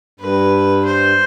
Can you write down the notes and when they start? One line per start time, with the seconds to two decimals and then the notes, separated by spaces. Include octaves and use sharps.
0.20 G2 B4
0.86 C5